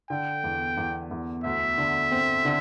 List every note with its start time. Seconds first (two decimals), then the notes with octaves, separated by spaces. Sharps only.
0.10 D3 G5
0.44 E2
0.77 E2
1.11 E2
1.44 D2 E5
1.78 D3
2.11 C4
2.45 D3